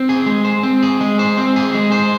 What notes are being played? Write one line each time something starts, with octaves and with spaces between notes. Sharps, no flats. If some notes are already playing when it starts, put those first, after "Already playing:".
Already playing: C4
G#4
G#3
C5
C4
G#4
G#3
C5
C4
G#4
G#3
C5